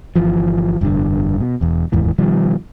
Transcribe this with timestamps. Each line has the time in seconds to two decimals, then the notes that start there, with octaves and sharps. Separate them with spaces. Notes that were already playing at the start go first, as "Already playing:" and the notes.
0.16 G1 E3 F3
0.81 F1 G2 A#2 D3
1.41 B2
1.61 E1 E2
1.92 F1 D#2 G#2 E3
2.18 B2 D#3 F3 G3